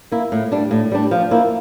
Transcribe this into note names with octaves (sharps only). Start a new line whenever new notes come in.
A#3 E4
A2
G3 D4
A2
G3 D4
F3
A#3 E4